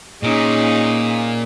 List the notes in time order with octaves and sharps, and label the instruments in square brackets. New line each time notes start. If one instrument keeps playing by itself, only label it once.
[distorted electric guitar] A#2 [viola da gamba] C#4 D#4 G#4